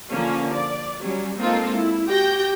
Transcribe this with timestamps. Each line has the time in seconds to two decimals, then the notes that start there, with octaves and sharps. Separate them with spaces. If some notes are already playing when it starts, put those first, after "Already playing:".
0.11 D3 F3 A#3 C#4
0.55 D5
1.01 F#3 G3 C#4
1.39 G#3 A#3 C4 D#4 F4 A4
1.74 E4
2.10 F#4 G4 G5 G6 A#6